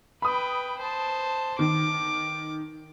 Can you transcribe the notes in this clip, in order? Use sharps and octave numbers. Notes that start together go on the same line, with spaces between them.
B4 G5 B5 D#6
C5 A5
D#3 D6